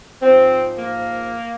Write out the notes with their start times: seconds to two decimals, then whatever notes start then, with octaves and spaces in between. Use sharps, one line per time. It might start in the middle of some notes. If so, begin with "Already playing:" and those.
0.22 G#2 F3 C4
0.78 G#2 F3 A#3